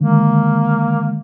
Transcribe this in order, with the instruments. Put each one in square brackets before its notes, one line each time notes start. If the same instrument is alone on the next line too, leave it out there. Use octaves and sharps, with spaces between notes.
[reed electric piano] D3 D#3 G#3 [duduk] A#3